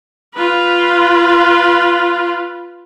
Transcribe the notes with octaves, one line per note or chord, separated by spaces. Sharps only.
F4 B4